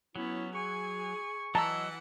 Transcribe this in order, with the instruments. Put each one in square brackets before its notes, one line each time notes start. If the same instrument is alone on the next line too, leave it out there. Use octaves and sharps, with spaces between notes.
[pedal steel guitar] F#3 [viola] B3 C#4 [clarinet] E4
[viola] G#4 G#5 [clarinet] C#6
[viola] E3 F#5 [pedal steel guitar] F#3 D#5 E6 [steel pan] A5 A#5